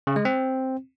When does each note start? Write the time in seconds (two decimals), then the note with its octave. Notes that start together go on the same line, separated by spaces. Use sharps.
0.07 C#3
0.16 G#3
0.25 C4